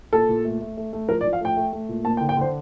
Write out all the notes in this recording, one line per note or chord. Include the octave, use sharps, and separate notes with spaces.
A#2 A4
A#2
A3
A3
A3
A3
F3 A#4
D5
F3
F5
A3 G5
A3
A3
A#2
A#3 A5
G5
D3
G5
D3 C5